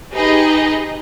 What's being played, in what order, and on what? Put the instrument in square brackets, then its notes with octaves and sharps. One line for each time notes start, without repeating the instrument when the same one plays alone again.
[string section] D#4 G4 G#4 B4 D#5